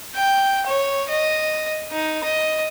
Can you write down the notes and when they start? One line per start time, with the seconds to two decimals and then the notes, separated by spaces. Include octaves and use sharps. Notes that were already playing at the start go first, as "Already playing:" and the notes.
0.16 G5
0.66 C#5
1.09 D#5
1.92 D#4
2.24 D#5